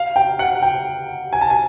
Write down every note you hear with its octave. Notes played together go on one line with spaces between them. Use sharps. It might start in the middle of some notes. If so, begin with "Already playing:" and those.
Already playing: F5
G5
F#5
G5
G#5
A5
G#5